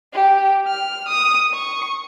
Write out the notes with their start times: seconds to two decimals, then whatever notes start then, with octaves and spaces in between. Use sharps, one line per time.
0.13 G4
0.67 F6
1.08 D#6
1.54 C#6